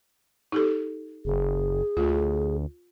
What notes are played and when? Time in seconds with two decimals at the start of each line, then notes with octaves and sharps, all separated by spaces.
0.52 D#4 G4 A4
1.25 F#1 G#4
1.97 D2 F4